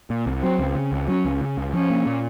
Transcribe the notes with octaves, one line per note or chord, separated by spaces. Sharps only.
A#2
C2
F#3 C4
C#2
C#3
C#2
F#3 C#4
C#2
C#3
C#2
F3 C#4
A#3
A#2